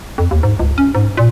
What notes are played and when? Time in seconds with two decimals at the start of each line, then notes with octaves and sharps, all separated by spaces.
0.18 F2
0.31 D#2
0.43 G#2
0.59 C#2
0.78 C#4
0.95 G#2
1.17 A#2